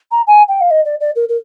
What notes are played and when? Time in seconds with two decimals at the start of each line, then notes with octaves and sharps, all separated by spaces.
0.11 A#5
0.27 G#5
0.48 G5
0.61 F5
0.71 D#5
0.85 D5
1.00 D5
1.15 A#4
1.29 A#4